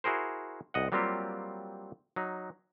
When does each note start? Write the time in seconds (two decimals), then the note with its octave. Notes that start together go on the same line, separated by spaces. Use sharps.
0.04 E4 F#4 G#4 A#4 C5
0.74 C2 D#5 F#5
0.92 F#3 G3 A#3 C4 F4 G4
2.16 F#3 D#4